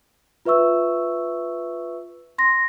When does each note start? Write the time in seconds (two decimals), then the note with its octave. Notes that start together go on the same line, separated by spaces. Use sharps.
0.45 F4 B4 E5 C#6 E6
2.38 C6 A#6